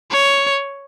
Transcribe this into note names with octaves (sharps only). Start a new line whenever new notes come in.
C#5